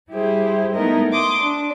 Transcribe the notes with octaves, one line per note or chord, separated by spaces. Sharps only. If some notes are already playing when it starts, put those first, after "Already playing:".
G3 E4 G4 G#4 C5
A3 B3 D#4 E4 A#4 D#5
C6 D6 D#6
D4